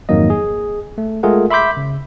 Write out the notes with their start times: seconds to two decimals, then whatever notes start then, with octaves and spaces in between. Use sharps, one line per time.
0.09 F2 G#2 D#3 F#3 A#3 D#5
0.30 G#4
0.98 A3
1.23 G#3 A3 F4 G#4 A#4 F#5
1.50 E5 B5 C6 D6 G6 B6
1.77 C#3